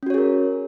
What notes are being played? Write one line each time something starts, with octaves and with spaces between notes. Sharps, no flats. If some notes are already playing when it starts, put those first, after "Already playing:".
C#4 F#4 G#4 A#4 C#5